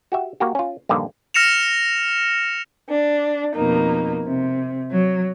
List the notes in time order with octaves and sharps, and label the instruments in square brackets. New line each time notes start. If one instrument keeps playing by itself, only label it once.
[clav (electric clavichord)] F#4 G4 E5
A#3 F#4 G4
C#4 F4
A#1 G2 D3 D#3 A#3
[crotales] F6 A#6 C#7 E7 F7
[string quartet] D4
F2 B2 A#3 D#4
C3
F#3